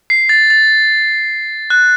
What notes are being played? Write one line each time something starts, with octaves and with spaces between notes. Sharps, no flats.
C7
A6
A6
F#6